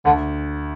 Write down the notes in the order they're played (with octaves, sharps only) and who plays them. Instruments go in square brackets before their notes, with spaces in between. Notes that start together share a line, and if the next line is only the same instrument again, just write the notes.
[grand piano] D2 [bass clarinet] D3